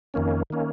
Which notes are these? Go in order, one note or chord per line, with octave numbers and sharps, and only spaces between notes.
F2 D#3 A#3 C#4
D#3 A#3 C#4